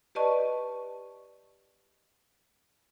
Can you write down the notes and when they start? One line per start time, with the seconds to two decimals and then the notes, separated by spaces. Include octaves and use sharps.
0.15 G4 B4 D5 D#5 A5 C#6